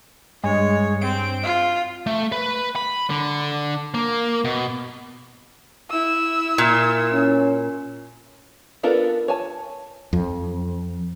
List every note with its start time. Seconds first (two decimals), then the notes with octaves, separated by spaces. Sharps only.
0.43 G2 G#3 C#5
1.01 C4 D7
1.43 F4
2.06 A3
2.32 B4
2.76 B5
3.10 D3
3.94 A#3
4.45 B2
5.90 E4 E6
6.58 A#2
7.13 C#4
8.83 B3 D4 F4 A4 A#4
9.28 C#5 G#5 A5
10.13 F2